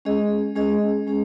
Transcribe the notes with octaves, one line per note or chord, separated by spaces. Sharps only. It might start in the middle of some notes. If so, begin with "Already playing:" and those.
G#3 C#4 G#4 D#5
G#3 C#4 G#4 D#5
G#3 C#4 G#4